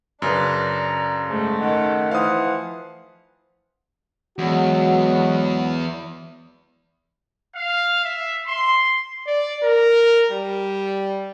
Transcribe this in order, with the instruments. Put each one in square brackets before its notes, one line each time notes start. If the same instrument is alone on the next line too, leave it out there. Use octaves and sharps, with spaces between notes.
[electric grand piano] F#2 C#3 B4 [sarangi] D4 [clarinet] A#5
[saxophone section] G#2 [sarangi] A3
[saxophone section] D#3 [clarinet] F#5
[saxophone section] E3 F3 [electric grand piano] F5 D#6 [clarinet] F#5
[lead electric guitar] E2 [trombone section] F#3 G#3 F#4
[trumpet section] F5
E5
C6
[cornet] D5
A#4
G3